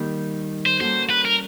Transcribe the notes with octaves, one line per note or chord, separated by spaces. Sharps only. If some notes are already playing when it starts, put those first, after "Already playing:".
Already playing: D#3 G3 A#3
C5
G3 A#3 C#4 F#4 A4 C5
B4
A#4